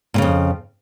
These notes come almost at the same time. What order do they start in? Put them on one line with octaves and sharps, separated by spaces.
A#2 C#3 F2